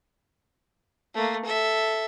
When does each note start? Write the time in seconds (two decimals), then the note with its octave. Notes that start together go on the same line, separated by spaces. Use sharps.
1.14 A3 A#3
1.45 A4 E5